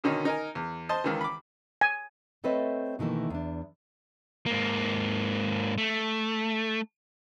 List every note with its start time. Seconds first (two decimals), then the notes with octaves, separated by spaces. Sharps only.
0.04 B2 D3 D#3 C#4 D#4
0.25 D#4 A#4 G#5
0.55 E2
0.89 C5 D#5 A5
1.04 C#2 D#3 E3
1.21 B5 D6
1.81 G#5
2.44 A3 C4 A4 B4 C#5 D#5
2.99 B2 D#3 E3 A3 A#3
3.30 E2 D4
4.46 G#2 A#3
5.78 A3